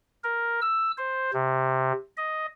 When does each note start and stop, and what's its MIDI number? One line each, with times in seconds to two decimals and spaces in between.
0.24 0.60 70
0.62 0.91 88
0.98 1.31 72
1.33 1.92 48
2.17 2.46 75